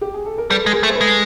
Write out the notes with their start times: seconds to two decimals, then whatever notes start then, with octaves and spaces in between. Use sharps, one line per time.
0.01 G4
0.14 G#4
0.26 A4
0.38 A#4
0.50 G3 A4 B4
0.64 G#3 A4
0.72 G#4 A#4
0.83 A3
0.90 C5
0.95 A4 B4
1.01 G#3